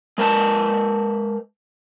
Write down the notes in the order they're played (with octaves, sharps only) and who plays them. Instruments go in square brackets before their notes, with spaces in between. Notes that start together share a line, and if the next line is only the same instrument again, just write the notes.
[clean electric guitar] G#3 A#4 B4 A5